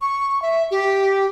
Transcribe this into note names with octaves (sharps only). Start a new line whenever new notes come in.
C#6
E5
G4